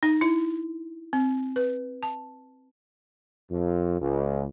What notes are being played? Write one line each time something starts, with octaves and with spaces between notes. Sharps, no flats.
D#4
E4
C4
B4
A5
F2
C#2